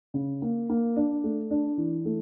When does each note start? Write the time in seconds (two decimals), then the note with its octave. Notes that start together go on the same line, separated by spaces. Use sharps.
0.14 C#3
0.42 A#3
0.69 A#3
0.96 D4
1.24 A3
1.51 D4
1.78 E3
2.05 A3